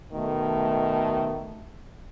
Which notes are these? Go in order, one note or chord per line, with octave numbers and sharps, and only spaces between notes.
B2 D#3 A3